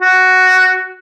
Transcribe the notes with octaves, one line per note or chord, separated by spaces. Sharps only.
F#4